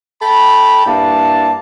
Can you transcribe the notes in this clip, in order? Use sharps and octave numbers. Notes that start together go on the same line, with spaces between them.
A4 G5 B5
G2 A#3 E4 D5 A5